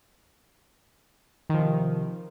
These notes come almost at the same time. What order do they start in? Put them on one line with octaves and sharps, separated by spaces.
D#3 F3 C3